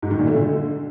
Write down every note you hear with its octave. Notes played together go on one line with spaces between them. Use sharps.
G#2
D#3
A#2
A3
D3